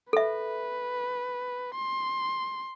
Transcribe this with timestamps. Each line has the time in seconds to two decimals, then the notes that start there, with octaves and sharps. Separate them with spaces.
0.13 A4 B4 E5
1.76 C6